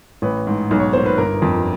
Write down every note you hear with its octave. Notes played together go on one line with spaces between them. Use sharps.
A1 B4
G#2
B1
C#5
A#2 C5
B4
G1 A#4
F2